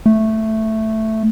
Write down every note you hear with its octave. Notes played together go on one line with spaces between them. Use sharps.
A3